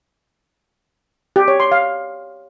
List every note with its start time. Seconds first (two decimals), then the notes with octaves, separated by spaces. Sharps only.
1.36 G4
1.48 C#5
1.60 C6
1.72 F5